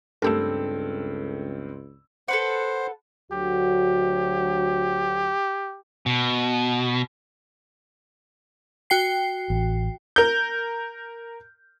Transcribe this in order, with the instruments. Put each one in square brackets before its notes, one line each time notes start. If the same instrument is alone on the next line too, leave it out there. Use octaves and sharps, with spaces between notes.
[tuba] C#2 [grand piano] G2 C4 E6 [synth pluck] A3 G4 A#4 [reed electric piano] A4
[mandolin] A4 B4 F#5 [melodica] C5
[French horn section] D2 F#3 F#4 [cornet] G4
[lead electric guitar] B2
[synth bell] F#4 G5 C7
[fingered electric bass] A1
[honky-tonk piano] A#4 G6